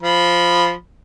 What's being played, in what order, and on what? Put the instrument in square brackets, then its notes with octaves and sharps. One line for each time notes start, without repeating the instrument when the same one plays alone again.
[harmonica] F3 B5